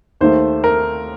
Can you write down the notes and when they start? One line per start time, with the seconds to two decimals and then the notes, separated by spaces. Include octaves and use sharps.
0.21 D#2 D#3 A3 C5
0.64 A#4